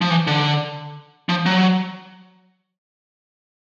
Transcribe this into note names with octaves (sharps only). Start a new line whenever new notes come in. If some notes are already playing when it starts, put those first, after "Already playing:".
F3
E3
D3
F3
F#3